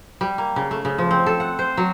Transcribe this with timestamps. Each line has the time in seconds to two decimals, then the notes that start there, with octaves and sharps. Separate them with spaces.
0.21 G3
0.38 A#3
0.56 C#3
0.71 A3
0.85 C#3
0.98 F3
1.11 C4
1.26 A4
1.40 F#5
1.59 C5
1.77 F#3